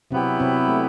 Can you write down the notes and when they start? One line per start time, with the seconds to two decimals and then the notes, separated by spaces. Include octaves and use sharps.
0.11 C3 F#3 B3 C4 E4 G4
0.40 C3 C4
0.68 A3